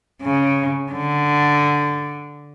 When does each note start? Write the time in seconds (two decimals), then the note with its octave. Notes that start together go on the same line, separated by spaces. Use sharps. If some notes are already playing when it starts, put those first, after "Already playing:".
0.22 C#3
0.92 D3